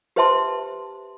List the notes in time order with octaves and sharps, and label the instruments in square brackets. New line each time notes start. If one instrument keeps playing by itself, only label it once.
[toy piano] G4 B4 C5 E5 A5 C6